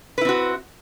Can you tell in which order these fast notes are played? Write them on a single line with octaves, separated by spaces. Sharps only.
B4 E4 C4 F#4